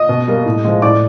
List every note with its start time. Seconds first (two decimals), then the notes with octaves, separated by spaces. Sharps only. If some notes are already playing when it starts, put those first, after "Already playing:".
Already playing: D#5 D#6
0.09 B2
0.28 G3 A#3
0.46 A2
0.65 F3 G#3
0.82 A2 D5 D6